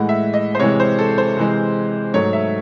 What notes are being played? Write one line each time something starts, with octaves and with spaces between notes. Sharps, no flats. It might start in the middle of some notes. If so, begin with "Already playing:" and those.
Already playing: A2 E3 G#3 F#5
E5
D#5
C5
C3 E3 G#3 C#5
C5
A4
C5
C3 E3 G#3
G#2 F#3 A3 C#5
E5